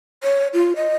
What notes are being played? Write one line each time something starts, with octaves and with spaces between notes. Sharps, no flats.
C#5
F4
D#5